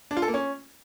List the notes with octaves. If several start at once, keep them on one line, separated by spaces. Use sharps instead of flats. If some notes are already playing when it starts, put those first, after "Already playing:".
D4
F4
A4
A#3
C#4